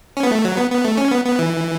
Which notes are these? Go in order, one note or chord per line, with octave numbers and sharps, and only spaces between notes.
C#4
B3
A3
F#3
B3
B3
A3
C#4
B3
B3
E3